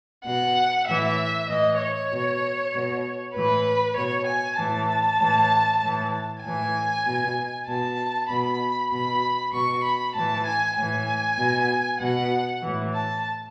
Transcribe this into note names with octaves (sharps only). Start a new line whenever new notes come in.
B2 F#5
A2 E3 E5
A2 E3 D#5
C#5
B2
B2
A2 E3 B4
B2 C#5
G#5
A2 E3 A5
A2 E3
A2 E3
A2 E3 G#5
B2
B2 A5
B2 B5
B2 B5
B2 C#6
B5
A2 E3 A5
G#5
A2 E3 G#5
B2
B2 F#5
A2 E3
A5